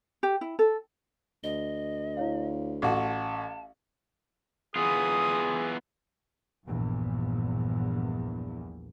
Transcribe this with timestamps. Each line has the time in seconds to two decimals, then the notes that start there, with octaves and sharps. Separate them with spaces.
0.23 G4
0.41 E4
0.59 A4
1.44 D2 D#5 G7
2.17 E4 C#5 F5
2.82 A1 F#4 F5 A5
4.76 E3 B3 F4 G#4 D#6
6.66 A#1 E2 G2 A#2